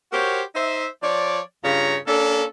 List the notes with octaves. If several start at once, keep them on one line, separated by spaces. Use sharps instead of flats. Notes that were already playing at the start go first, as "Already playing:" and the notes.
F#4 G4 A#4 C5 C#5
D#4 C5 E5
F3 C#5 D5
G2 C#3 F4 C#5 A#5
A#3 C#4 D4 A4